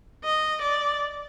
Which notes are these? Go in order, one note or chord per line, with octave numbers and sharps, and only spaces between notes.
D#5
D5